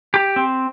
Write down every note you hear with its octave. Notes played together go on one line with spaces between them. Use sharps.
G4
C4